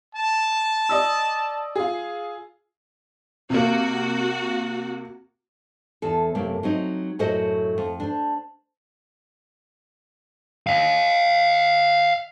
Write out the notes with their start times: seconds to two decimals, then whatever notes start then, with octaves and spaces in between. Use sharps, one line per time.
0.15 A5
0.89 D5 D#5 E6
1.76 F4 G#4
3.50 C3 A#3 F#4
6.02 E2 A4
6.35 F#2 C3 A3 A#3
6.63 F#3 C4 D#4
7.19 F#2 A2 F#4 A4 C5 D#5
7.78 F2
8.00 D4 C5
10.67 D#5 F5